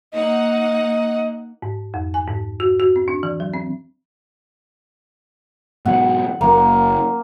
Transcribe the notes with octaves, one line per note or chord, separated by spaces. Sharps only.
A#3 D#4 D#5 F#5
G#2
F2
G#5
G#2
F#4
F#4
C4
D4
E3
F#3
C4
G#2 B2 F#3 F#5
F#1 F#2 A#3